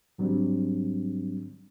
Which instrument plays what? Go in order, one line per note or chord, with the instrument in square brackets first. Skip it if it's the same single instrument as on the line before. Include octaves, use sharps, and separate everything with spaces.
[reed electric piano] G#2 F#3 G3 C4 D4